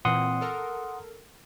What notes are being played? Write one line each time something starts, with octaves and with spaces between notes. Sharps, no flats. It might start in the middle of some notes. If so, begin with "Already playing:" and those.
A#2 E3 C4 F#5 C6 D#6
A4 A#4